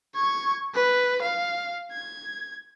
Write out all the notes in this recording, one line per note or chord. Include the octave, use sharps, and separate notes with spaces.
C#6 G#6
B4
F5
G#6